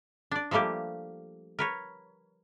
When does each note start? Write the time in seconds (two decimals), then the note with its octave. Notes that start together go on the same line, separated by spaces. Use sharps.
0.31 D4 D5
0.51 F3 G3 A3 A#3 G4
1.59 A#4 B4 C#5